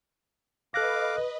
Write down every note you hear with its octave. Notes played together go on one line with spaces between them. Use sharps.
A4 B4 D#5 F5 D6 F#6 A#6